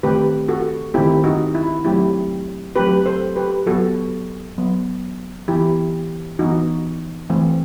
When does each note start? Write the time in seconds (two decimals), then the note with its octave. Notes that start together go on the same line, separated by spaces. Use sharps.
0.03 D#3 A3 C4 G4 B4
0.48 F#4 A4
0.94 D#3 A3 C4 E4 G4
1.24 D#4 F#4
1.55 E4
1.84 F#3 A3 C4 E4 G4
2.76 F#3 A3 C4 G4 B4
3.06 A4 C5
3.36 G4 B4
3.66 F#3 B3 F#4 A4
4.58 F#3 B3
5.48 E3 B3 E4 G4
6.39 E3 B3 D#4 F#4
7.30 E3 A3 C4